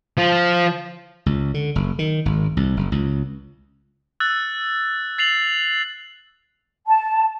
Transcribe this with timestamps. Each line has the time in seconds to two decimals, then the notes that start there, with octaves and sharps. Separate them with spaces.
0.17 F3
1.26 C#2
1.54 D3
1.76 F#1
1.99 D#3
2.26 G#1
2.57 C2
2.77 F#1
2.92 C#2
4.20 E6 F#6 A6
5.18 A6 C7 F7 F#7
6.87 A5